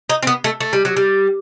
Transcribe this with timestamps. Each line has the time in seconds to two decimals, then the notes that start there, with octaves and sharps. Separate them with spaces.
0.10 D#4
0.23 C4
0.27 B3
0.44 A3
0.61 A3
0.73 G3
0.85 F#3
0.97 G3